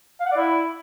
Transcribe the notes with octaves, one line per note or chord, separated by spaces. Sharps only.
F5
F#5
D5
E4